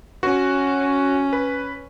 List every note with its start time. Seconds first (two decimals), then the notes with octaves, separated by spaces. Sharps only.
0.23 C#4 F#4
1.33 B4